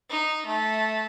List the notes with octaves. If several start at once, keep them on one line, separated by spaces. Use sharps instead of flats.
D#4
A3